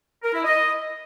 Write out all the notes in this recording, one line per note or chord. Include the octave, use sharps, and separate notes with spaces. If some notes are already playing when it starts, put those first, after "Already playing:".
A#4
E4
D#5